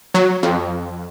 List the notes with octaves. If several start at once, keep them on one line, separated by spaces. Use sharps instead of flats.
F#3
F2